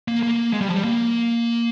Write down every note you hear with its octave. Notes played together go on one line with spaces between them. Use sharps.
A#3
A#3
G#3
G3
F3
G3
A#3